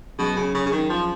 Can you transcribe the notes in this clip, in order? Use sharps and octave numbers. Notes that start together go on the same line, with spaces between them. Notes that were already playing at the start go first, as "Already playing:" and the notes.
B2 F#3 C#4 G#4
C#3
C#3
C#3
D#3
F3